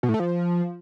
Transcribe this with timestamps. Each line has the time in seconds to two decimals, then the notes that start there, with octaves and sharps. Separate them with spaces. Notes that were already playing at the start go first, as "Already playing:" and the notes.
0.03 B2
0.09 A2
0.14 A3
0.20 F3